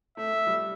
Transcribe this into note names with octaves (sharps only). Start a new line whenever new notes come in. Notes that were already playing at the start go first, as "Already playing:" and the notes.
A3 E5
A3
G3